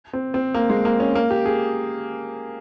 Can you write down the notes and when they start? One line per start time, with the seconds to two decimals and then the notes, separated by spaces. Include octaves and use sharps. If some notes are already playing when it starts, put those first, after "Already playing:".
0.13 C4
0.34 C4
0.54 A#3
0.70 G#3
0.85 A#3
1.00 C#4
1.15 A#3
1.31 G4
1.46 G#4